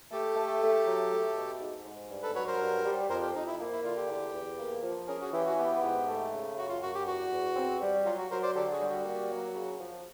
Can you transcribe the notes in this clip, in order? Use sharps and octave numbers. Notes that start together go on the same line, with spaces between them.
A3 G4 A4
A3
A3
F#3
A3
B2
G#2
G#2
G2
A4 B4
F#3 B4 C#5
A#4 C5
G2
G3
F2 A#4 C5
G4
F2 D#4
E4
A#3
E4
D3 F4
G4
E2
E2
A#3
F3
C#4 G#4 A#4
F#4 G#4
E3 G4
F#4
B3 G4
G#2
A3
C#3
F#2 F#4
F4
F#2 F#4
G4
E2 F#4
E2
C4
G3
F#3 F4
F#4
F#3 A#4 C5
C5 D5
D3 G4 A4
F#4 G#4
G3
F#4
A#3
F#3
C#3
F3